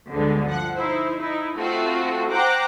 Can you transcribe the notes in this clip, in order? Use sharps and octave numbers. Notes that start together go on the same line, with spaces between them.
D2 G2 D3 G#3 B3
F3 F#5
D#4 E4 C5
D#4 E4
A3 C4 F4 F#4
C5 F#5 G5 A#5 D6